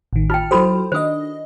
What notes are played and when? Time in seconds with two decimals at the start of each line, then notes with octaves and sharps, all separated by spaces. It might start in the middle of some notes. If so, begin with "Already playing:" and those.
0.13 A1 D#3
0.30 F4 G5 A5 F6
0.51 F#3 E4 F#4 A4 C5 B5
0.92 D#3 D4 C5 D#5 D#6